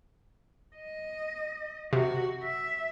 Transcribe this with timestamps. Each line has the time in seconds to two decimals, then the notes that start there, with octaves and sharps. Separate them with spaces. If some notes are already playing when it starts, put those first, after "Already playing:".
0.77 D#5
1.93 C3 F#4
2.43 E5